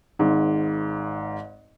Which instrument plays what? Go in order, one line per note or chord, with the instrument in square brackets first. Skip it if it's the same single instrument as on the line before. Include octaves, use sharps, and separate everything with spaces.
[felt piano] G#1 G#2